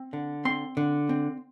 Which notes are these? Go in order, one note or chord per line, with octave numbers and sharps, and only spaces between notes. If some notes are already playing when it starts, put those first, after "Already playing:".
Already playing: C4
D3
C4 C6
D3
C4